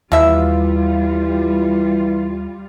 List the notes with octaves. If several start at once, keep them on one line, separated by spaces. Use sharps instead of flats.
D#2 B2 E3 G3 F4 E5 F5